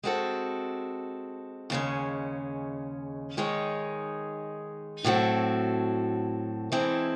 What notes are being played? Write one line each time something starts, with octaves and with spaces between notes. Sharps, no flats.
G#3 C4 F#4 A4
D#2 C#3 G#3 C#4
D#3 G#3 D#4 G#4 C#5
A2 F#3 C4 F#4 A4
E3 G#3 C4 E4 A4